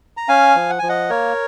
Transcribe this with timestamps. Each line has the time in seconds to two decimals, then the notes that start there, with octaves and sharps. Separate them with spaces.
0.17 A#5
0.28 C#4 F5 G#5
0.56 F3
0.69 F#5
0.79 F3 G#5
0.89 D#5 F#5
1.10 A#3 A#4 C#5